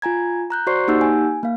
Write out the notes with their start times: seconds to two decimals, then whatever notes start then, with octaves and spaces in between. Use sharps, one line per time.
0.02 F4 G#5 A#5 G#6
0.50 A#5 F#6 G6
0.67 F#4 C5 D5 C6 C#6 C7
0.88 A#3 D#4 G4 F#5 E6 G6
1.01 G#5
1.43 A#3 F5